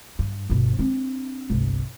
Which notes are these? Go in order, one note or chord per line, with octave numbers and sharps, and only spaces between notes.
G2
G1 B2
C4 D4
G1 C2